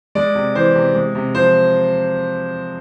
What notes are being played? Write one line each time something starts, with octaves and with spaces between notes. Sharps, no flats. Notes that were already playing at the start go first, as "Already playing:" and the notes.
G#3 D5
C3
E3 C5
C3
G#3
C3
F3 C5